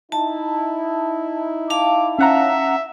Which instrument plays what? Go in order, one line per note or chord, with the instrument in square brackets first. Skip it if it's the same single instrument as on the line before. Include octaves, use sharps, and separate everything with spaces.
[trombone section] D#4 E4 [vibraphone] A5
[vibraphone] F5 A5 [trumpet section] D6
[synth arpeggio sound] C#4 F#5 A#5 [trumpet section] E5